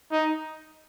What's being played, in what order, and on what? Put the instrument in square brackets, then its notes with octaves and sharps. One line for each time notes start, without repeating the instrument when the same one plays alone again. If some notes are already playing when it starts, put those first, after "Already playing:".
[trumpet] D#4